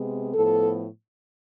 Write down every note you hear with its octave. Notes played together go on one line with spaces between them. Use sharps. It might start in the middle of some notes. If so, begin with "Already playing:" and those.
Already playing: C3 G#3 B3
A2 F3 B3 A4